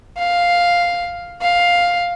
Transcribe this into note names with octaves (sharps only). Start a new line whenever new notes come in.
F5
F5